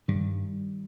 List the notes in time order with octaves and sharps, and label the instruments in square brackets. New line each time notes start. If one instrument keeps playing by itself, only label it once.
[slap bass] G2 D#3 G3